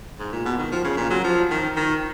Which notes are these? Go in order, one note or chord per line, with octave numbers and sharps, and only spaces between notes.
G#2
A#2
B2
D#3
F3
C#3
A#2
F#3
F3
D#3
D#3